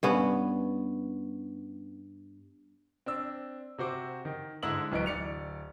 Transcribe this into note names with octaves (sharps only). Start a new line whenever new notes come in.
G2 B3 C#4
C4 D4 E6
C3 F#4 C5 D6
D#3
G#2 D3 E4 E6 F#7
D1 E3 D#4 D7
D1 D5 C#7 F7